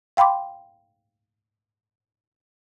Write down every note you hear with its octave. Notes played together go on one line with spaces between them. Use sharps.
F5 G5 B5 C6 D6